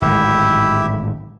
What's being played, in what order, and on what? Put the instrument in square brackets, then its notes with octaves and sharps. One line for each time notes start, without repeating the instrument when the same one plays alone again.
[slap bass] D1 G#1 G#3 [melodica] E4 G4 E5